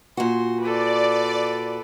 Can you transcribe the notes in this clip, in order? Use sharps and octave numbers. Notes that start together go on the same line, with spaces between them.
A#2 F#4 C6
A4 B4 D5